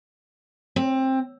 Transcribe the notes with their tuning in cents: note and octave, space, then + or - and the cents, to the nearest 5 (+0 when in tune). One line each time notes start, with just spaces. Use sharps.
C4 +15